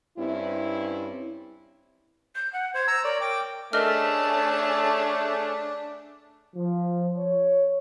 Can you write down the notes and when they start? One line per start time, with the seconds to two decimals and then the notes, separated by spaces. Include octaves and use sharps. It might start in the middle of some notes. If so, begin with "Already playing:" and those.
0.18 G2 C4 C#4 E4
2.35 G6
2.53 F#5
2.75 C5 G#6
2.88 A#5 E6
3.04 A#4 C#5 D5
3.21 G5 D6
3.73 A3 C#4 D4 G#4 A#4 D#5 A5 F6
6.54 F3
7.17 C#5